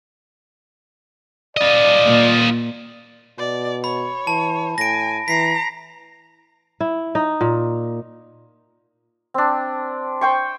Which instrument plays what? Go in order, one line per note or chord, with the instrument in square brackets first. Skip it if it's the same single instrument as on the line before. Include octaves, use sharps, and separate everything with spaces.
[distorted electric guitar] F4 D#5 [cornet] D5
[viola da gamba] A#2
[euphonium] B2 [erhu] D5
[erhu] C#5 [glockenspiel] B5
[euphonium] E3 [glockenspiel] A5
[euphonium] A2 [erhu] G#5 [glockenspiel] A#6 D7
[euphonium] E3 [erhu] A#5 [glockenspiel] B6 C7
[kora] E4
D#4
A#2
[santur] C4 D4
C5 G5 C#6